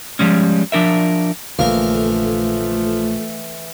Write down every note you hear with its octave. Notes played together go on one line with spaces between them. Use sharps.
F3 G3 G#3 C#4
F3 D4 A#4 E5
A#1 A#2 D3 E3 F3 A3 A#4 F5